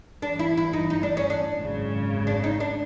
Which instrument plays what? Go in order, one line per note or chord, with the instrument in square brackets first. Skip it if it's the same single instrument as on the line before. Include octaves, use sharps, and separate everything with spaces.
[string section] G1 G2 E3 [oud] D4
[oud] E4
E4
D#4
D#4
D4
C#4
D4
[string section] G#1 F#2 C#3
[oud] D4
D#4
D4